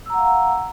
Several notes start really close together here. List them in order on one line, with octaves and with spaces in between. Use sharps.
E6 A#5 F#5 F5